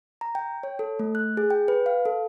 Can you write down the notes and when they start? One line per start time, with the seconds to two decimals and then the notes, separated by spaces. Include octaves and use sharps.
0.21 A#5
0.35 G5
0.63 C#5
0.79 A4
0.99 A3
1.15 F#6
1.37 G#4
1.50 G5
1.68 B4
1.86 F5
2.05 A4